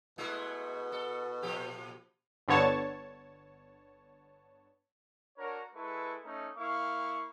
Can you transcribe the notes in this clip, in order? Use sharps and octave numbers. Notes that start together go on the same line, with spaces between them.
B2 G#3 A3 E4
A4
A#2 F3 G4
G1 D3 B3 C#5 A5
D4 F#4 A#4 C#5
G#3 E4 A4 B4 C#6
A3 C#4 D#4
A#3 E4 F5 C#6